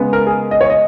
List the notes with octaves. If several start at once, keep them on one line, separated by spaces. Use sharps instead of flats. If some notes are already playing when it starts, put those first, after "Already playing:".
Already playing: C#3 G#3 B3
A#4
G#4
D#5
C#5
D#5